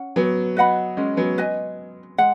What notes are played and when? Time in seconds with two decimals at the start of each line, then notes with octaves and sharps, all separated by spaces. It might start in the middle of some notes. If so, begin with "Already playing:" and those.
Already playing: C#4 F#5
0.16 F#3 B3
0.57 B4 D#5 F#5 B5
0.97 G#3 C#4
1.17 F#3 B3
1.38 B4 D#5 G#5
2.18 G#3 F#5